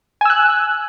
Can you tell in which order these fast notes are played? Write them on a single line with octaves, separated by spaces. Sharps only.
G#5 E6 F#6